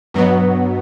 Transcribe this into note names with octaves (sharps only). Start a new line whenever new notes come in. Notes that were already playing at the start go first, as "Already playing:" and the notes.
G2 B2 F#3 B3